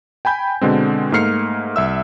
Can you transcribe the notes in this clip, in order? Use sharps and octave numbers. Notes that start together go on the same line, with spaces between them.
G5 G#5 B5 G6
B2 D3 G#3 C4
G#2 A3 A#3 F6 C7 C#7
C2 E5 E6